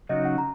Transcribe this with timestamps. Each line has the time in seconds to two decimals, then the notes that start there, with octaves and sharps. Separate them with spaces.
0.09 C#3 F#3 D#4 F#4 D#5
0.25 F#5
0.38 A#5